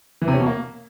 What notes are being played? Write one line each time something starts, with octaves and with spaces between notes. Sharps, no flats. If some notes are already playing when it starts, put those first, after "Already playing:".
E3
C3
C#4
B2
A#3